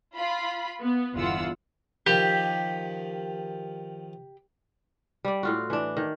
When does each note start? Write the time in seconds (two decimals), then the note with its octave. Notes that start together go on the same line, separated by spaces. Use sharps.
0.16 F4 B5
0.80 B3
1.15 G1 E2 F4 F#5 E6
2.06 D#3 F3 G4
5.25 G3 D5
5.43 A2 F4 F#4
5.70 E3 D4
5.97 D#3